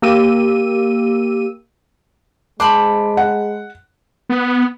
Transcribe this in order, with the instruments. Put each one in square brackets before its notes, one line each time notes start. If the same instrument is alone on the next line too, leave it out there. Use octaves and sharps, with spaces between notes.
[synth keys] A#3 G4 E6 D#7
[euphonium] G#3 [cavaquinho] C5 A5 B5 [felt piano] D6
[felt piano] F#5
[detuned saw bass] B3